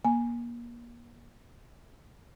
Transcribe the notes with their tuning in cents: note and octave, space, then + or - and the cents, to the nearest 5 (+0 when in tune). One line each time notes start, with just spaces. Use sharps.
A#3 +30 G#5 +0